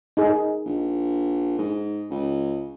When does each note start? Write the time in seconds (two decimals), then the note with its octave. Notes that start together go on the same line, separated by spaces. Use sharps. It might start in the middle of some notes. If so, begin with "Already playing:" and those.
0.17 D#4 G#4
0.65 A#1
1.58 G#2
2.11 C#2